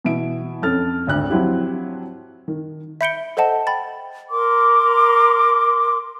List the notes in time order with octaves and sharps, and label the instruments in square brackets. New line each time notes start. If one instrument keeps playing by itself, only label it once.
[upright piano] B2 E3 E5 D7
F2 C#4 A4 F6 A6
G#1 D2 F#6
F3 F#3 C4 E4 G4
D#3
[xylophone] E5 B5 G6 C#7 D7 G7
A4 C5 D#5 F#5 A5
G5 B5 A6
[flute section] A#4 C6 D6